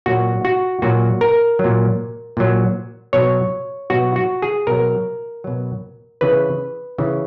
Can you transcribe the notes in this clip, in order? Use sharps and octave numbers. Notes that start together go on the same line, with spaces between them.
A#2 F#3 F#4
F#4
A#2 F#3 F#4
A#4
F#3
A#2
A#2 F#3
B2 F#3 C#5
B2 F#3 F#4
F#4
G#4
B2 F#3 A#4
B2 F#3
C#3 E3 B4
C#3 E3